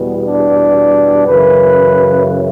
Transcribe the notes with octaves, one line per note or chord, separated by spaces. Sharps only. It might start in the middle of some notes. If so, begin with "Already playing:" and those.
Already playing: E2 B2 G3 B3
D4
F#2 C#3 E3 B4